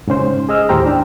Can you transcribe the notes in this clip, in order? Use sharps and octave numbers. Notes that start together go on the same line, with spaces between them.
G#2 C#3 C#4 C5
G#4 D#5 E6 F6
D#2 A2 G4 C5 G5 A#5
D4